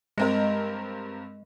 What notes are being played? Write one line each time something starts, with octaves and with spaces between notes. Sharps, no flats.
G2 G#3 C4 A#4